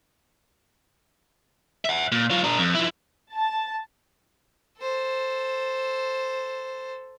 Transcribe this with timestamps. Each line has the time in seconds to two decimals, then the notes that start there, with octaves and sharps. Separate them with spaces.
1.85 E5 F#5
2.12 A#2
2.30 F#3 F4
2.44 D4 A#4
2.58 F2
2.75 F3 E4
3.34 A5
4.80 A4 C5